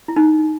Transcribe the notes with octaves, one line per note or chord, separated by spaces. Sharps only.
E4
D#4